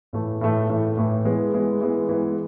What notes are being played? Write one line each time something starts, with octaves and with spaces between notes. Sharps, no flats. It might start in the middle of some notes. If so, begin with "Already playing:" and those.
A2 E3 A3
A2 E3 A3
A2 E3 A3
A2 E3 A3
E3 G#3 B3
E3 G#3 B3
E3 G#3 B3
E3 G#3 B3